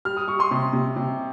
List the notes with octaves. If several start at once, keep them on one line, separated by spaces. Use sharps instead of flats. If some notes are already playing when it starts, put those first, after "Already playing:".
G3 F6
D#6
G3 C#6
C6 D#6
C3
C3
C3